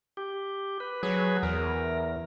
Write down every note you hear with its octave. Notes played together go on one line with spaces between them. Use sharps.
G4
B4
F#3 G#4 B4
E2 A#4